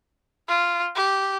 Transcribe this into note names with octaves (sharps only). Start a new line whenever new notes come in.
F4
G4